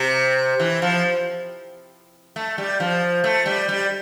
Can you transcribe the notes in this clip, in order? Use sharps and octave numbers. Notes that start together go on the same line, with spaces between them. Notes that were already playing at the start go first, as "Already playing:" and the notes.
Already playing: C3
E3
F3
A3
G3
F3
A3
G3
G3